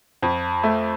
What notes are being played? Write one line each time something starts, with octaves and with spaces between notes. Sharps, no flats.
F2
A3